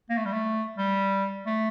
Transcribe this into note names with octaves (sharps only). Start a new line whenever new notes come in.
A#3
A3
G3
A3
G3
A3